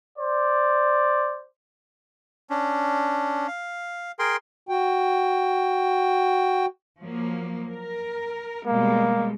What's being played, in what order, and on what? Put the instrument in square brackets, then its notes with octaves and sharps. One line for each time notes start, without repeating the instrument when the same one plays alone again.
[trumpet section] C5 D5
[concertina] C#4 D4
F5
G#4 A#4 G5 C6
[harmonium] F#4 G5
[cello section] F3 F#3 A#3
A#4
[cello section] B2 G3 G#3 [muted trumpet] A#3